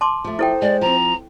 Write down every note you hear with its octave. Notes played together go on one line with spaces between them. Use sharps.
A5 C6 D6
F3 A3
E4 A4 C5 G5
G#3 D5
F3 C4 A#5